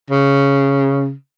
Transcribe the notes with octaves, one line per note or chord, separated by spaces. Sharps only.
C#3